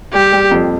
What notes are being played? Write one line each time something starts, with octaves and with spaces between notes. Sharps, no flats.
G3 G4
G3
F2